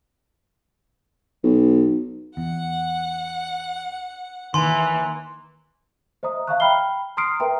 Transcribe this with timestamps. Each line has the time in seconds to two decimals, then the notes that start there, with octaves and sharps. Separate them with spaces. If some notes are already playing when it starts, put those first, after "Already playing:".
1.43 B1
2.37 E2 F#5
4.54 D#2 D#3 E3 G#5 A#5 C6
6.23 C5 D#5 E5 A#5 D#6
6.47 E5 F5 A5 A#5 C#6 F#6
6.60 G5 B5 F6 C7 G7
7.17 A#5 C6 D#6 F6 C7 D7
7.40 A#4 B4 E5 G5 A#5